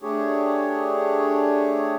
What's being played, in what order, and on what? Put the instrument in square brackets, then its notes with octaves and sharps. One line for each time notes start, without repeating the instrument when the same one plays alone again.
[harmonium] A3 D4 G4 G#4 C#5